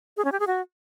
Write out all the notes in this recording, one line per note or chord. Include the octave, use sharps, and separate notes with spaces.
G#4
C#4
G4
G#4
F#4